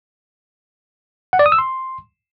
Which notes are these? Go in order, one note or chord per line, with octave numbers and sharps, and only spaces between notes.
F#5
D5
D#6
E6
C6